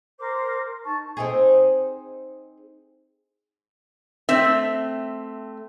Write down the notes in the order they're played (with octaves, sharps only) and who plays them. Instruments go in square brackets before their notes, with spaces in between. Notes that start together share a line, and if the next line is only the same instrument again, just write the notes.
[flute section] A#4 C5 D6
D#4 A5 C#6
[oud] C4 D#4 G#4
[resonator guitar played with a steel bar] A3 C4 E5